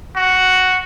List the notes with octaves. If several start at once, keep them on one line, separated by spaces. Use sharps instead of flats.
F#4